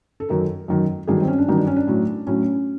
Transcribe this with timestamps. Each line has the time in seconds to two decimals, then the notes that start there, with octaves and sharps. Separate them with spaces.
0.20 A4
0.29 F#2 D#3 F#3 A#4
0.68 F#2 D#3 F#3
1.07 G2 D#3 F#3 G#4
1.20 C4
1.28 C#4
1.38 D4
1.48 G2 D#3 F#3 D#4
1.57 D4
1.67 C#4
1.76 D4
1.88 A2 F#3
2.27 A2 F#3 C#4